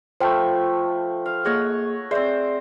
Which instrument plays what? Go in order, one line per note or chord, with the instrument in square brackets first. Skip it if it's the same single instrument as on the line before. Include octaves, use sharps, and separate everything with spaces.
[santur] F3 A3 B5 [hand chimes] C5 G5
[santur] F5
[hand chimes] A#3 G#4 [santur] C#5 D#5 F#5
[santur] C4 C5 [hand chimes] G#4 D5 E5